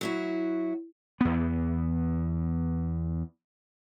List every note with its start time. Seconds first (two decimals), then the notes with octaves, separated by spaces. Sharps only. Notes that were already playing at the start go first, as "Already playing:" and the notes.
0.01 F#3 E4 F#4
1.21 E2 B3